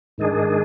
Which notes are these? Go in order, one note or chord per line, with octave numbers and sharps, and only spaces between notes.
G#2 D#3 G#3 D4 G#4